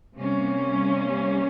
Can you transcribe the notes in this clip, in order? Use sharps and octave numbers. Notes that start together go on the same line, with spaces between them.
C3 G3 A#3 C#4